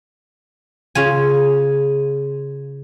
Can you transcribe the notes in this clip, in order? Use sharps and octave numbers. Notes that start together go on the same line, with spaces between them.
C#3 F4 G#5